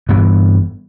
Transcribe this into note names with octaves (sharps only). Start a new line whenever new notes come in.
G2 E3 B3